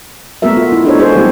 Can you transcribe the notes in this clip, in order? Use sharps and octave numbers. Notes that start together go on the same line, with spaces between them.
G#3 A3 B3 F#4 A#4 E5
F4
E4
D4 D#4 F#4 A4 C5 C#5
G#3 F#4 G#4 B4 C5
F#3 G#3 A3 B3 E4 G4